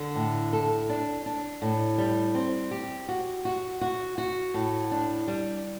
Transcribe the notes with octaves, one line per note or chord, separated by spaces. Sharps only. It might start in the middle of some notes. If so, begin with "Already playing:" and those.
Already playing: D3
A2
A4
D4
D4
A2
G3
C4
G4
F#4
F#4
F#4
F#4
A2
D4
G3